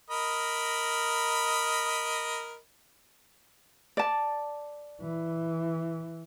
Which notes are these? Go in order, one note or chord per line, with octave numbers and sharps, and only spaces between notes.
A#4 D#5 B5
D5 A5
E3